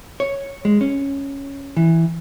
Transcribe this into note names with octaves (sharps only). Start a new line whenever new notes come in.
C#5
G#3
C#4
E3